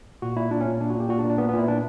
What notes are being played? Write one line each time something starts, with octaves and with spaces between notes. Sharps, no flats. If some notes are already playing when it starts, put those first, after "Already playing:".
A#2 F#4
A#2 E4
A#2 D4
C#4
A#2
A#2 D4
F#4
A#2
G4
A#2 F#4
D4
A#2
D4
A#2 B3
B3
A#2
E4
A#2 D4